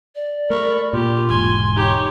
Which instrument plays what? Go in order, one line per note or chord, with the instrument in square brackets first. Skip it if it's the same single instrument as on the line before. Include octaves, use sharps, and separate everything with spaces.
[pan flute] D5
[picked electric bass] A3 [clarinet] A#4 [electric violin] B5 C#6
[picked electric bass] A#2 [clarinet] F4 [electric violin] G4
[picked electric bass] E1 G#2 [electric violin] G#5 [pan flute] C6
[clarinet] D#4 [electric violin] G4 C#5